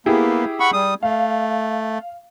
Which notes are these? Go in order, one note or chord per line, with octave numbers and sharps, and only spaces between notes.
A#3 B3 E4 G4 G#4
F#5 B5 C#6
G3 D#6
A3 F5